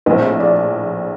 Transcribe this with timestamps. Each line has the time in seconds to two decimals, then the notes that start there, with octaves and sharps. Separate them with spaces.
0.06 A#1 A2 A3 C4 D#5
0.40 D5